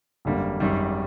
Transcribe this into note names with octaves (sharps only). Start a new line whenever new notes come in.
G#1 F#2 D3 G3 A#3
G#1 F#2 D#3 G3